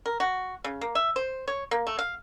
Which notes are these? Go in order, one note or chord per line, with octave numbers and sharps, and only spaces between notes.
A#4
F#4
C#3
A#3
E5
C5
C#5
A#3
A3
F5